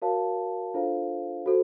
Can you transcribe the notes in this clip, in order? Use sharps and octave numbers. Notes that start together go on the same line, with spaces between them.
F#4 A#4 C#5 F5 A5
D4 F4 A4 C5 F5
F#4 A4 C5